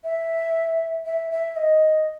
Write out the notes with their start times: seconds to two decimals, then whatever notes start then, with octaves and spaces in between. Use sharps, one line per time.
0.04 E5
1.06 E5
1.31 E5
1.56 D#5